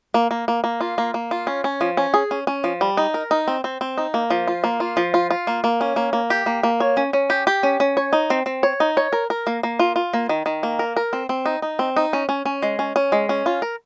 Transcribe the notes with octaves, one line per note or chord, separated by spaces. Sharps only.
A#3
A#3
A#3
A#3
F4
A#3
A#3
F4
C#4
C#4
F3
C#4
G#4
C#4
C#4
F3
G3
D#4
A#4
D#4
C4
C4
C4
D#4
A#3
F3
F4
A#3
F4
F3
F4
F4
A#3
A#3
C#4
A#3
A#3
G4
A#3
A#3
C#5
C#4
C#4
G4
G4
C#4
C#4
C#5
D#4
C4
C4
C#5
D#4
C#5
A#4
A#4
A#3
A#3
F4
F4
A#3
D#3
D#3
A#3
A#4
A#4
C4
C4
D#4
D#4
C4
D#4
C#4
C#4
C#4
G#3
C#4
C#4
G#3
C#4
F4
A#4